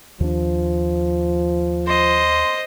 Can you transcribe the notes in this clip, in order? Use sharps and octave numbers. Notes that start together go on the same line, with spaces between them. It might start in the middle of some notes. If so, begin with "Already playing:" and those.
D#2 F3 D4
C5 D#5 C6